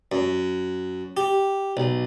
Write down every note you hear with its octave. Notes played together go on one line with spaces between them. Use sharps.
F#2
G4
B1